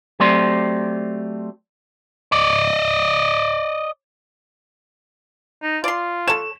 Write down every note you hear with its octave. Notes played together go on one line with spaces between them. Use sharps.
F#3 A3 C4 G4 D5 C6
D5 D#5
D#4
F4 D5 C6
A4 C#5 E7